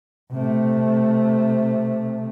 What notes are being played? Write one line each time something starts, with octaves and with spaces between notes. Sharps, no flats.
C3 A3